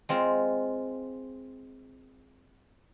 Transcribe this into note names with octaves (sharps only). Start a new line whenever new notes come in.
G#3 C4 F4